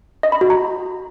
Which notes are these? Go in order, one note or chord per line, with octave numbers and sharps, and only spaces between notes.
D#5
B5
F#4
A#5